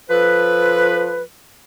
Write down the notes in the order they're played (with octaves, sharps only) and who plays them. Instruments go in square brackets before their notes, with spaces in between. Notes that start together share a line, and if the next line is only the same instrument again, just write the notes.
[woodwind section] F3 A4 B4